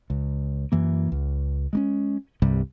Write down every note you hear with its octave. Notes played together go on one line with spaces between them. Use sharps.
C#2
F#2 E3 A#3
C#2
G#3 A#3 C#4
C2 G2 C3 G3